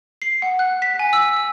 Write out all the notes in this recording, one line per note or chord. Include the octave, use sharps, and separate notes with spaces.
C7
F#5
F#6
B6
G#5
E6
E6